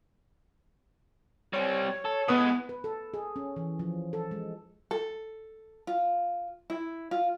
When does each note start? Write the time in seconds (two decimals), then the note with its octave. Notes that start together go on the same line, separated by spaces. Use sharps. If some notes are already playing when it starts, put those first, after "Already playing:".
1.53 G3 C4 C#5
2.05 A4
2.28 A2 G#3 B3 B4 D#6
2.69 B4
2.84 A4
3.14 G#4
3.36 C#4
3.56 E3
3.79 F3
4.13 A4
4.31 G#3
4.91 A4
5.87 F4
6.70 E4
7.11 F4